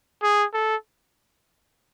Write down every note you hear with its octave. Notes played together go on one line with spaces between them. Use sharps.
G#4
A4